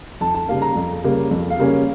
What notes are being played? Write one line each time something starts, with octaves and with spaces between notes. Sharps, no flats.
F2 A5
A5
C#3 G3 A#3 F5
A#5
F2
C#3 G3 A#3
F2
F5
C#3 G3 A#3 C#4